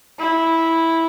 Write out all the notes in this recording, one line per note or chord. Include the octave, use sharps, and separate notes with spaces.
E4